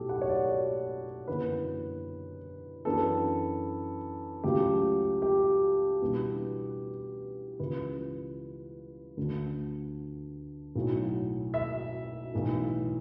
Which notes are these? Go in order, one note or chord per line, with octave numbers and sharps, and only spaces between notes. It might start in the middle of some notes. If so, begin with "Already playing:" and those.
Already playing: B1 A2 F#3 G4 A4
F#5
C#5
D5
C#5
F#1 E2 D3 B4
F#2 E3 B3 D4 A4
C#2 C#3 F#3 A3 G4
G4
E2 B2 G3 D4
C#2 C#3 E3 B4
D2 D3 A3 D4
B1 A2 F#3
E5
B1 A2 E3